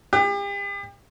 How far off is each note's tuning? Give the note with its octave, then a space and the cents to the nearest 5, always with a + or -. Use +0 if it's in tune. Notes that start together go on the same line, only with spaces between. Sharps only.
G4 +40